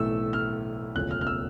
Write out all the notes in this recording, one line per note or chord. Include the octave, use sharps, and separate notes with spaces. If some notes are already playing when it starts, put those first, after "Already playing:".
Already playing: B1 A2 E3 A3 E6
F6
E1 D2 C#3 F3 F#6
F6
F6
E6